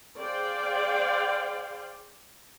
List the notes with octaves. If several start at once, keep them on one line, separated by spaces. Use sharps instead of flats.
G#4 C5 D5 F5 G5